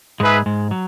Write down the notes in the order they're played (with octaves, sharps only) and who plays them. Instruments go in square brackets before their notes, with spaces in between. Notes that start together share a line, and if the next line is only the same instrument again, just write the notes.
[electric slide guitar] G#2 G#3 [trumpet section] D#4 G#4 B4 E5
[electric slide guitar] G#2 G#3
F#3